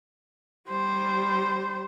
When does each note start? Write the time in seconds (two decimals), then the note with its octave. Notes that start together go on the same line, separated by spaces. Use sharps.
0.70 G3 C5